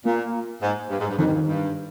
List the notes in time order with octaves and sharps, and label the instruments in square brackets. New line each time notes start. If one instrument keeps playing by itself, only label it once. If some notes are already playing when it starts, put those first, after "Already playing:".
[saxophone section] A#2 [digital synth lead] A#3
[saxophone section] G#2
G2
G#2
G2
[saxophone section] F2 [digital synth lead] D#3
[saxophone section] G2
F2
G2